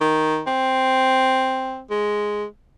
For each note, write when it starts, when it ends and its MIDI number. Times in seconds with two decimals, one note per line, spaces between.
0.01 0.41 51
0.47 1.81 60
1.90 2.45 56